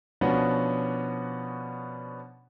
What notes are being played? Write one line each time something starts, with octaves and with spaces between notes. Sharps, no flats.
B2 F3 B3 C#4 D4 F#4